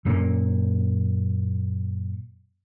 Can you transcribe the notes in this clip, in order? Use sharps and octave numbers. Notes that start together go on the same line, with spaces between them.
F#2 A#2 A#3 C#4